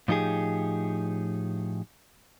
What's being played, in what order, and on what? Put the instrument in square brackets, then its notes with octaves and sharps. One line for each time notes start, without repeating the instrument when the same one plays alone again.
[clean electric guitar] A2 F3 D#4 G4 G#4